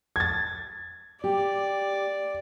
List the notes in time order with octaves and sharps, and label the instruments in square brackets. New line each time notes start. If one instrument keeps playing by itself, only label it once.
[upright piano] G#6 A6
[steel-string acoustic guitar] G4 [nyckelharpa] D5